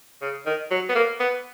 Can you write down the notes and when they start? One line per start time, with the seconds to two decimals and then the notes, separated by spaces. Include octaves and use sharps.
0.22 C#3
0.46 D#3
0.71 F#3
0.89 B3
0.95 A#3
1.20 B3